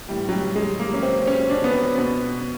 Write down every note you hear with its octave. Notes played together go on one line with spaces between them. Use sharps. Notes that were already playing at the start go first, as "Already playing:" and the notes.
A2 E3 G3
F#3
G3
G#3
A#3
C#4
C4
C#4
D4
B3
C4
B2 B3